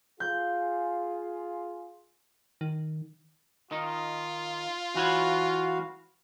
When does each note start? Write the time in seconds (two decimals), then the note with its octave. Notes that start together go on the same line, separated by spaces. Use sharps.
0.20 F4 G#4 G6
2.61 D#3
3.71 D#3 D#4 F4
4.95 E3 F#4 B4 C#5 F5